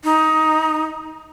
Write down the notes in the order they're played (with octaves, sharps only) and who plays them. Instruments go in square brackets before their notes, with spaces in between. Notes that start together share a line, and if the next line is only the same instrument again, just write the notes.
[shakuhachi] D#4